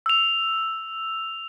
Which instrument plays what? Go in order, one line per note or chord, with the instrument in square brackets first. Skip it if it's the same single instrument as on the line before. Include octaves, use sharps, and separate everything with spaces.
[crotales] E6 F7